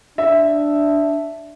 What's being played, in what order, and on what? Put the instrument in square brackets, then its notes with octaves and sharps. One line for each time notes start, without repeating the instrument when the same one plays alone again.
[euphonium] D4 [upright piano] E5